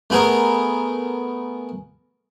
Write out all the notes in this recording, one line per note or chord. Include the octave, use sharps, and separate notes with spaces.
A3 B3 G#4 A#4